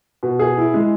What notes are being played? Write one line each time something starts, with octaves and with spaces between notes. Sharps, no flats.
B2
G#4
E4
G#3